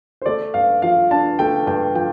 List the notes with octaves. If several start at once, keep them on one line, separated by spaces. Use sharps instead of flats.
C5
A3 D5
G2 F5
F3 F5
D4 A5
A3 G5
G2 G5
F3 G5